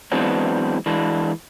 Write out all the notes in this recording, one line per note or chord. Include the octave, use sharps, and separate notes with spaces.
E3 F#3 G#3 B3 C4 D4
E3 G#3 D4